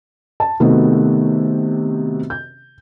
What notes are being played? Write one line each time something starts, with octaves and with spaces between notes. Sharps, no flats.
A5
C3 D#3 A3 B3 F#4 G4
G6